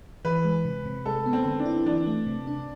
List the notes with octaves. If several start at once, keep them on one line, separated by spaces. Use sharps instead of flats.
E3 B4
G#3
C3
C3
G#3 A4
B3
C4
D3
D4
E4
E3 D4
A3
C3
D4